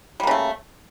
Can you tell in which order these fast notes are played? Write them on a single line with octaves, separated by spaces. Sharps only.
G3 A#3 C#3 A3